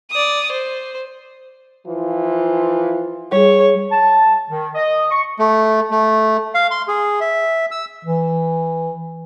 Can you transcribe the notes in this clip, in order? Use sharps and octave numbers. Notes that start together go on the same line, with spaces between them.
D5 D#6
C5
E3 F3 F4
G3 G#4 C#5
A5
D#3
D#5
C#6
A3
A3
F5
C6
G#4
E5
E6
E3